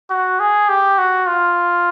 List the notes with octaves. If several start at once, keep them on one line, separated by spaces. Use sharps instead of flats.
F#4
G#4
G4
F#4
F4